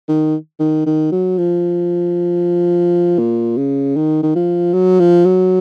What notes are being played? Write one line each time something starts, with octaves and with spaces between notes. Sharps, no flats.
D#3
D#3
D#3
F#3
F3
A#2
C#3
D#3
D#3
F3
F#3
F3
F#3